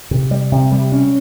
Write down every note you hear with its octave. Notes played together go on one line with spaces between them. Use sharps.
C3
G3
C3
G3
C#4